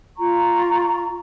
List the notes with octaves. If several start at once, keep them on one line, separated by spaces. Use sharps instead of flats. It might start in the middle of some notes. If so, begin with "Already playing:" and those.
F4 A#5 C#6